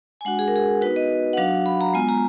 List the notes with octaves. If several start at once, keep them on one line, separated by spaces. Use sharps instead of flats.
G#5
G#3 D4 F#4 F#5
G#4
A#4
G#4
B3 D#4 F#4 B4
D#5
F#5
F#3 D4 F#4 F5
B5
A#5
G#3 B3 F4 G#5
A#5